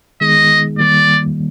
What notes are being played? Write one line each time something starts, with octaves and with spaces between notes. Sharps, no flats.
D#3 G#3 B3 D#4 G#4 D#5
D#3 G3 A#3 D5